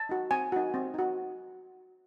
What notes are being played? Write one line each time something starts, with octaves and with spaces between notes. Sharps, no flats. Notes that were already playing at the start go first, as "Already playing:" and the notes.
Already playing: A5
D#4 F#4
C4 G#5
D#4 F#4
C4
D#4 F#4